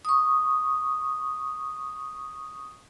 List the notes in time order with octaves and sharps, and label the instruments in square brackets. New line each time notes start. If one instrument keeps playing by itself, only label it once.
[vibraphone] C#6 D#6